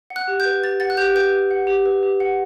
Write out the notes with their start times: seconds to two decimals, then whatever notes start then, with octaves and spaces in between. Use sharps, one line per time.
0.10 F#5
0.16 F#6
0.28 G4
0.40 G6
0.45 B4
0.64 G4 A6
0.80 F#5 A6
0.90 F#6
0.97 G4 G6
1.15 B4 G6
1.32 G4
1.51 F#5
1.67 G4
1.86 B4
2.03 G4
2.20 F#5